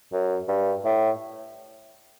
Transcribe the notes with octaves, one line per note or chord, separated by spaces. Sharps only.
F#2
G2
A2